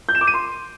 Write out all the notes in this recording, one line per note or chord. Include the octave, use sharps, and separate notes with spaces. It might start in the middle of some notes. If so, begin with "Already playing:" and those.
G6
E7
D6
D#7
C6